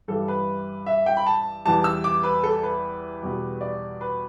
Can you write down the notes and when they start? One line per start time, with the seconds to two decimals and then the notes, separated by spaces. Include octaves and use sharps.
0.08 G2 E3 G3 A4
0.28 B4
0.86 E5
1.06 G5
1.17 B5
1.26 A5
1.65 E2 E3 G3 A5
1.84 E6
2.04 D6
2.23 B4
2.43 A4
2.63 B4
3.22 E2 B2 G3
3.61 D5
4.01 B4